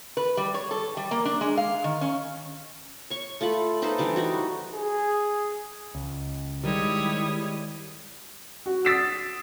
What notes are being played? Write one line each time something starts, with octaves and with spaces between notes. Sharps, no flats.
B4
G3
C#5
A4
G3
A#3
D4
G#3
F5
D#3
C#4
C#5 C#6
A3 F4 A4 B5
D#4 A4 B4 C5
E3 G3 D4
G3 D#4 F#4
G#4
C#2
D#3 G3 G#3 E4 G4 C#5 D#6
F#4
D#6 E6 A6 B6 D7 E7